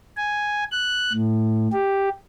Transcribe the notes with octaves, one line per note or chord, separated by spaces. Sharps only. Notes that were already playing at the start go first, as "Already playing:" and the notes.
G#5
F#6
A2
G4